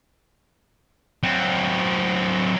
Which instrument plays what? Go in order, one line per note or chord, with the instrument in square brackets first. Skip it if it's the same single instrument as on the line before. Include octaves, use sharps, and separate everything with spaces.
[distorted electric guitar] F#3 C4